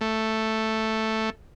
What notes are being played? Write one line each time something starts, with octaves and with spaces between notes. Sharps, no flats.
A3